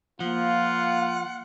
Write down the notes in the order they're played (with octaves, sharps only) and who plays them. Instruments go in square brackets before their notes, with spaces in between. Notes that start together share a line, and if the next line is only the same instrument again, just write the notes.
[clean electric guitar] F3 [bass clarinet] A#3 [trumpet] F4 [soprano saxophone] F#5